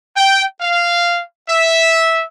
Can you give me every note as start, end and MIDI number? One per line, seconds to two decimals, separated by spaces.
0.16 0.43 79
0.61 1.22 77
1.48 2.23 76